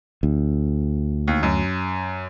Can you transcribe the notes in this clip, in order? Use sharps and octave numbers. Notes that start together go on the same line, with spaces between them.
D2
D#2
F#2